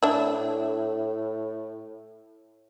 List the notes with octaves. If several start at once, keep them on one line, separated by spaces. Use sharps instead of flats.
A2 D4 E4